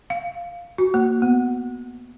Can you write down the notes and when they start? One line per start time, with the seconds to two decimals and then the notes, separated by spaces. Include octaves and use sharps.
0.10 F5
0.78 F#4
0.94 A#3
1.22 B3